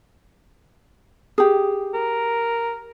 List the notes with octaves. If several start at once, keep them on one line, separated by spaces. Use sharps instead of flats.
G4 G#4
A#4